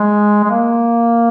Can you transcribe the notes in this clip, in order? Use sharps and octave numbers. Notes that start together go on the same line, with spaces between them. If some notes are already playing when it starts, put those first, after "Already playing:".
Already playing: G#3
G#3
A#3